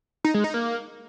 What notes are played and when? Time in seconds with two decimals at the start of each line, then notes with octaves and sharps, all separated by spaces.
0.25 D#4
0.34 G#3
0.44 D#4
0.54 A#3